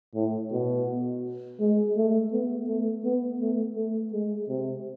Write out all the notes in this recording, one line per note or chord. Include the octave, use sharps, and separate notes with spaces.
A2
B2
G#3
A3
B3
A3
B3
A3
A3
G#3
C3